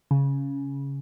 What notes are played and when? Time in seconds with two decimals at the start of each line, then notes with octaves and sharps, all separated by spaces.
0.11 C#3